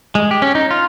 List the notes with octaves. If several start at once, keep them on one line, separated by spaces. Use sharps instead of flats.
G#3
G4
C#4
D#4
F4